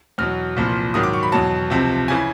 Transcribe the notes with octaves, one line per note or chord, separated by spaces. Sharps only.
E2 B2 F#3 F6
C2 A#2 F3
G#2 D#3 F#3 D#6
D6
C#6
B5
E2 B2 F#3 A5
C#2 C3 F3
C#3 E3 G#5